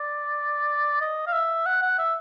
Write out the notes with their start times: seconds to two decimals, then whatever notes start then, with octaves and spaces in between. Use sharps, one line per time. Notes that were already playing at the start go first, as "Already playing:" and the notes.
Already playing: D5
1.01 D#5
1.27 F5
1.33 E5
1.66 F#5
1.82 F#5
1.98 E5